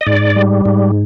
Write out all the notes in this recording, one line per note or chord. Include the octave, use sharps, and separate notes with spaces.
D#5
G#2 D5
G3
G#2